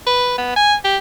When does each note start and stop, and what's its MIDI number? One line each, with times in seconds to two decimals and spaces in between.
0.07 0.33 71
0.38 0.51 59
0.56 0.74 80
0.85 0.97 67